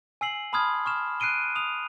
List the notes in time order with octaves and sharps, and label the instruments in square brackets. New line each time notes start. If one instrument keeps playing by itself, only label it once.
[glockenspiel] G#5 E6 C7 F#7
A5 B5 C6 D#6 F6 G#6
C#6 F6 E7
F#6 C7 D7 D#7 G7
D#6 F7